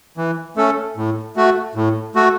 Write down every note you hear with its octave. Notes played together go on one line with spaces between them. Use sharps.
E3
A3 C#4 A4
A2
A3 F#4
A2
A3 F#4